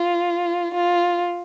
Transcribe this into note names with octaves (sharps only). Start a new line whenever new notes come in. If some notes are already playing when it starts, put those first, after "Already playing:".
Already playing: F4
F4